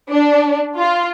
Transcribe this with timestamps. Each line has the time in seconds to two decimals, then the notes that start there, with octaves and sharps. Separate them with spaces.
0.10 D4
0.76 F4